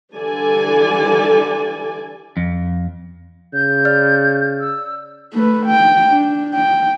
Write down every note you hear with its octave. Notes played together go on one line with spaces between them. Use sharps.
D3 E3 G3 A4 D5 G#5
F2
C#3 G6
D5 F6 A6
E6
A3 B4
G5
D4
G5